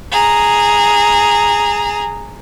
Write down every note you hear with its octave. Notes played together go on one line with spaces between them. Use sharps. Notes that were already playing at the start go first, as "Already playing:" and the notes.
G#4 A#5